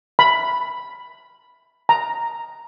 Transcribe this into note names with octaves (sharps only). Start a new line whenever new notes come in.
B5
A#5